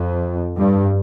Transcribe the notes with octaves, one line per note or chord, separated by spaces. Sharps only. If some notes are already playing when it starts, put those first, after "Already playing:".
Already playing: F2
G2